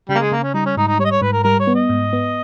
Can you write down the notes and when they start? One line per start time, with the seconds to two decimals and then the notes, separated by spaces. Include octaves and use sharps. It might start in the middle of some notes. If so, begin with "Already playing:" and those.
0.09 C#3 G3
0.15 A#3
0.20 G#3
0.31 C#3 A#3
0.43 C#4
0.54 G3 D#4
0.66 C#4
0.77 G#2 D#4
0.87 D#4
0.99 G3 C#5
1.05 D#5
1.11 C#5
1.22 G#2 B4
1.33 A#4
1.44 G3 A#4
1.59 C#5
1.67 B3
1.75 D#5
1.89 G#2
2.13 B3